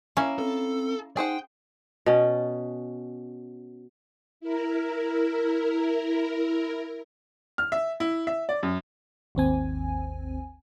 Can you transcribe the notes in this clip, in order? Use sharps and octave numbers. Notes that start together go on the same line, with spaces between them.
A#3 C#4 E4
C4 A4
D#4 G#4 C5 F#5 G5
B2 C#4
E4 A#4
F6
E5
E4
E5
D5
F#2
G#1 D#2 C4 G#5